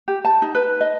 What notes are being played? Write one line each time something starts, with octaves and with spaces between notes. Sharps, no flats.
G4
A5
D#4
B4
D#5